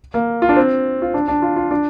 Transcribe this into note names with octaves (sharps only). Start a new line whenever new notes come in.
A#3
F4
D4
C4
F4
D4
D4
F4
F4
D4